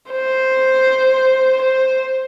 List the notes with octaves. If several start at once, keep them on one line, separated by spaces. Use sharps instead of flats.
C5
C5